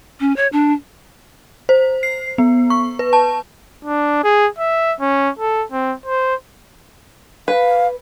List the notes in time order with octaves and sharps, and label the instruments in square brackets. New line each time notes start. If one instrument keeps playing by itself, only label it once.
[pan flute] C#4
C#5
D4
[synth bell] C5
C7
B3
C#6
B4
A5
[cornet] D4
G#4
E5
C#4
A4
C4
C5
[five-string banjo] B4 [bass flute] F5